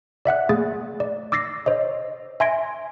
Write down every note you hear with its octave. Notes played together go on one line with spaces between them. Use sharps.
D5 E5 F#5 F#6
A3 A#3 G#4 A6
D5
D6 E6 A6 A#6 C7
C5 C#5 D#5
E5 G#5 C6 G#6 A#6 D7